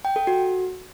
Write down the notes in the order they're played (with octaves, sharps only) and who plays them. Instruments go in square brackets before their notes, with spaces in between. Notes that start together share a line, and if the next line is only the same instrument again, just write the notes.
[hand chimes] G5
A4
F#4